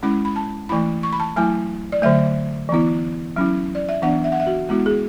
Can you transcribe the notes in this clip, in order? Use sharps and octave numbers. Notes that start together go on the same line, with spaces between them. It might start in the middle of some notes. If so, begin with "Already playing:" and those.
G#3 C#4 E4 B5
B5
A5
E3 A3 E4 B5
C#6
B5
A5
F#3 A3 E4 G#5
D5
D3 F#3 A3 E5
E3 B3 E4
F#3 C#4 E4
D5
E5
E3 B3 D4 F#5
E5
F#5
E5
F#4
G#3 B3 E4 F#4
G#4